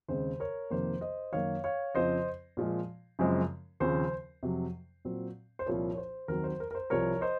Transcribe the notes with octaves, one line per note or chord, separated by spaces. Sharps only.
D#2 C#3 G#3 C4 C5
A#4 C#5
F2 C3 D#3 A#3 C5
C5 D#5
F#2 D#3 A#3 C#5 F5
C#5 F5
F2 C#3 F3 C4 C5 D#5
A#2 F3 G#3
F#2 C#3 F3 G#3 C4
D#2 C#3 F3 C4 C5
F2 C3 F#3
A#2 F#3 C4
C5
C2 A#2 F3 C4 A#4 C#5
C#5
C5
D#2 D#3 F#3 C4 A#4
C5
A#4
A#4
C5
C2 C3 F3 A#4 C#5
C5 D#5